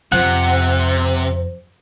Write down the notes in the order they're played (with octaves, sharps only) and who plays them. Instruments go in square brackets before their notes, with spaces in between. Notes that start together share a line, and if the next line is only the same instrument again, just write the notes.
[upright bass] F2 [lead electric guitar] C3 [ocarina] C5 [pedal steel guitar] F#5